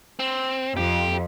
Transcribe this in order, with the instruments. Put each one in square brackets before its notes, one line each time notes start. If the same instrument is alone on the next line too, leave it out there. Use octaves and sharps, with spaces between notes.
[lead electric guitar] C4
[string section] F2 [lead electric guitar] G4